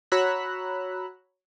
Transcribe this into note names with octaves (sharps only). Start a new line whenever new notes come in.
F#4 C#5 A#5 B5 E6 F#6